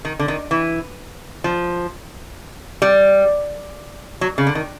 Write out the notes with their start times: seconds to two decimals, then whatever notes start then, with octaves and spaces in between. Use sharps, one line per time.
0.05 D#3
0.19 D3
0.28 D#3
0.51 E3
1.44 F3
2.82 G3
4.21 F#3
4.38 C#3
4.47 D3
4.55 D#3